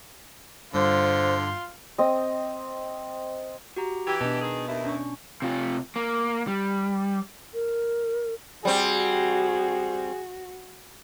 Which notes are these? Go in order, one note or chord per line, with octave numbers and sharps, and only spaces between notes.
G2 D3 F4 C5 C6 G6
C4 D#5
F#4 G4 A#5
E3 G4 E6 G#6
B2 D4 B4 D#5 A5
D#3 G#4
D#2 E4
C#4 D4 C#6
C3 F4
A#3
G3
A#4
G3 C4 F#4 G#4